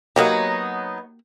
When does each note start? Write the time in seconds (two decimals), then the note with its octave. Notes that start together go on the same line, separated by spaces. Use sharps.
0.16 F#3 A#3 B3 D#4 F#4 G4